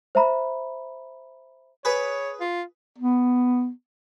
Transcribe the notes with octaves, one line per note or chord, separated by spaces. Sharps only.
C5 E5 A#5 B5
G#4 B4 C#5
F4
B3